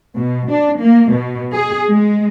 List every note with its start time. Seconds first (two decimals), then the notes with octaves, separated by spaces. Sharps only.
0.16 B2
0.51 D4
0.80 A#3
1.11 B2
1.54 G#4
1.89 G#3